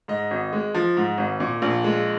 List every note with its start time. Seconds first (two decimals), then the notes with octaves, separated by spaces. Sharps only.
0.08 G#2 D#5
0.31 G#1
0.53 G#3
0.74 F3
0.97 G#2
1.18 G#1
1.40 A#2
1.62 A#1
1.84 G#3